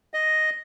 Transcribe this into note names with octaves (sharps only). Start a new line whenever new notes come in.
D#5